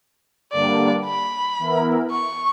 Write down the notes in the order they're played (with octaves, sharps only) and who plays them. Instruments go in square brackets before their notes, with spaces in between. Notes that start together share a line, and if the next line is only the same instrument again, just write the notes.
[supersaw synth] G2 D3 G3 A#3 D4 [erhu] D5
[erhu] B5
[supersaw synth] E3 B3 E4 A#4
[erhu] C#6